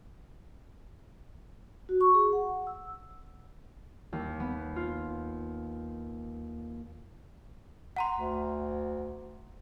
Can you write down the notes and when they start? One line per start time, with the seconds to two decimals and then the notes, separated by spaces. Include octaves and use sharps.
1.89 F#4
2.01 C#6
2.14 G#4
2.33 F#5
2.67 E6
4.13 D#2
4.40 B3
4.76 F4
7.96 F#5 A#5 C6
8.16 D2